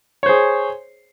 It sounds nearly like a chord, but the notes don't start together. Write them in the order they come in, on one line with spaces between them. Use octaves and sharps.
C#5 C5 G#4